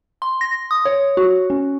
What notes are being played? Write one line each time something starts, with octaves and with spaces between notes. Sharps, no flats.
C6
A#6
D#6
C#5
F#4
C#4